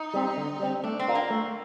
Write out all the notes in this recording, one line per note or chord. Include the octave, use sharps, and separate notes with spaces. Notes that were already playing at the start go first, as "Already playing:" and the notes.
Already playing: D#4
G3 C4
D3
G3 C4
A3 D4
C4
D4 F4 A#4
A#3
A3